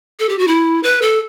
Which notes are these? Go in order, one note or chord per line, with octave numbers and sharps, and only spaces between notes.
A4
G4
F#4
E4
B4
A4